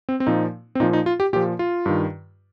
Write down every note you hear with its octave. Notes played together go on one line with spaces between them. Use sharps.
C4
C4
A#2 F3 D#4
C4
A#2 F3 D#4
D#4
F4
G4
A#2 F3 G4
F4
G2 D#3